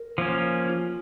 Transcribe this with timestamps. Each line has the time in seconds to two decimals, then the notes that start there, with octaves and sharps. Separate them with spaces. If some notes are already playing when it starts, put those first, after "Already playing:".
Already playing: A#4
0.18 F3 A#3 C#4
0.69 F4